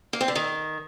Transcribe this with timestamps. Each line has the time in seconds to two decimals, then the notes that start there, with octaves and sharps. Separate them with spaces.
0.13 A#3
0.21 C4
0.28 D3
0.35 D#3